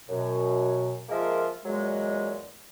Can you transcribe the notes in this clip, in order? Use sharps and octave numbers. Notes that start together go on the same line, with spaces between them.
F#2 B2
F3 G#3 A#3 F4 A#4 E5
E2 A#2 F#3 G#3